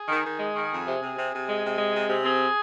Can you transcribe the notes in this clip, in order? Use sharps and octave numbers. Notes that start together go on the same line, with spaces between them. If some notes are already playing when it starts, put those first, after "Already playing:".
Already playing: G#4
D#3
D#3
G#3
D#3
F2
C3
C3
C3
C3
G#3
C3
G#3
C3
C3
C4 G#4